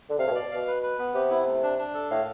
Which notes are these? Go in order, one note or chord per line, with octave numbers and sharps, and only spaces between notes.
D3
C3 F5
A2
B2
D5
B2 F5
B4
B4
B3
C3 G4
E4
A3
D4
D4
A4
A2 F5